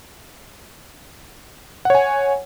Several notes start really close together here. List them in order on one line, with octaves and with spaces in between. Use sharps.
F#5 C#5 G#5